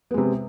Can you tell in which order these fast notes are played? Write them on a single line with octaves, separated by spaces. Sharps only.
B3 G#3 C3